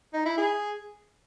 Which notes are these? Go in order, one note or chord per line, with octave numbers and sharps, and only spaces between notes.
D#4
E4
G#4